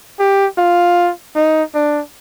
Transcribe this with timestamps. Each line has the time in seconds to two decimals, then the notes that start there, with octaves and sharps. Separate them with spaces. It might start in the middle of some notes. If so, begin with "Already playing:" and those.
0.19 G4
0.58 F4
1.36 D#4
1.74 D4